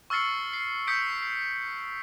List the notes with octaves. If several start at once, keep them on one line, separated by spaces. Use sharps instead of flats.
C#6 E6 F6 A6 C7 C#7
C7
D#6 G6 B6 C#7 D7
C7